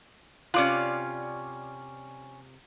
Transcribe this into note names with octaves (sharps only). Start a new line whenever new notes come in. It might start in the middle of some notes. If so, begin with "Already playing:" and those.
C3 C#4 F4 D5 F#6